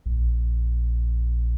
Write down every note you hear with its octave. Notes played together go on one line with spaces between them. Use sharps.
A#1